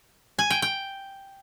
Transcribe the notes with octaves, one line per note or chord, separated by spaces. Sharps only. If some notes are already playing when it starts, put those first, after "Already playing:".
G#5
G5
G5